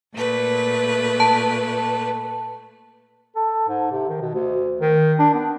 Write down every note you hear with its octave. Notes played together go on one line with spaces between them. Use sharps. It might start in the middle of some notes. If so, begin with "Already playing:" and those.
A#2 A3 B4
A5
A4
G#2
C3
D#3
B2
D2
D#3
D4
B3